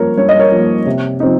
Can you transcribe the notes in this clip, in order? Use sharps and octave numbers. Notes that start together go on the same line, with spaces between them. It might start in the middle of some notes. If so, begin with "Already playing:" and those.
Already playing: G2 F3 A#3 A#4 C#5
G2 C#5
D#5
A#4 C#5
F3 A#3
C3
F3 C4 D#4